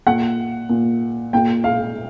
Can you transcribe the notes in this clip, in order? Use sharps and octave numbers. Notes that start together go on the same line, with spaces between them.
A#2 F#5
A#2
A#2 G5
F5